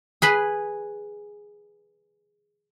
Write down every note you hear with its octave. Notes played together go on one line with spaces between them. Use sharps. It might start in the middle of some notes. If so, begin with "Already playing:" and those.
G#4 B4 B5